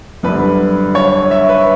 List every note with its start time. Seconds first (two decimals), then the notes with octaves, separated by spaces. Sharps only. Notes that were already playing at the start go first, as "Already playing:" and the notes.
0.23 F#2 D3 G3 B4
0.95 C#5
1.31 E5
1.49 B4